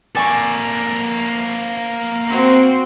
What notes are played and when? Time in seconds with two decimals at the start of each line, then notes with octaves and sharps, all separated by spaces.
0.15 A#3 A4 D5 G#5 C#6
2.30 C4 F#4 C5